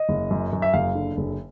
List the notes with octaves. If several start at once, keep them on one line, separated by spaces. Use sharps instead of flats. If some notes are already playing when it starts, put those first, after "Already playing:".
Already playing: D#5
F#1
F#2
F#2
E5
F#1 F5
D3
F#1